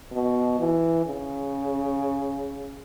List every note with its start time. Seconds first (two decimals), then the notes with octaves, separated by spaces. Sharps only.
0.12 B2
0.59 E3
1.06 C#3